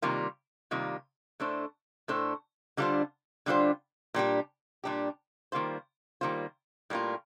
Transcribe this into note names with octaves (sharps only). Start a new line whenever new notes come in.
C3 D#3 G3 A#3 F4
C3 D#3 G3 A#3 F4
A2 A3 D4 A4 C5
A2 A3 D4 A4 C5
D3 G3 D4 F4 C5
D3 G3 D4 F4 C5
A#2 G3 D4 G4
A#2 G3 D4 G4
D#3 G3 A#3 F4 C5
D#3 G3 A#3 F4 C5
A2 G3 A#3 F4